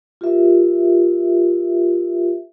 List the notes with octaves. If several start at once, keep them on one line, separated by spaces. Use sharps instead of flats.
F4 G4 A#4 E5